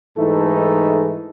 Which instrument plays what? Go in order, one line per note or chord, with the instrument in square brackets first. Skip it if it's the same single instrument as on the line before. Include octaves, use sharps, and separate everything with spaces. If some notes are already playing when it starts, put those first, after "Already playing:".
[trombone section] G#2 E3 A3 D#4 A4